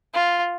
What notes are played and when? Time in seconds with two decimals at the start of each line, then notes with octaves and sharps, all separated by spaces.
0.14 F4